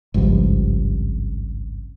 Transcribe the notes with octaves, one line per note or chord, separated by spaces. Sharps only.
G#1 C#2 G2 F3